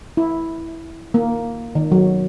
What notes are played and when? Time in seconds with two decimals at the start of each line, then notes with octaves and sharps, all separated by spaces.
0.17 E4
1.14 A#3
1.75 D#3
1.92 F#3